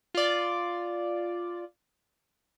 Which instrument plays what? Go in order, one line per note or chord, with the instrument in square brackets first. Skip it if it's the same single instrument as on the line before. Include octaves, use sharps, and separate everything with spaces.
[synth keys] F4 D5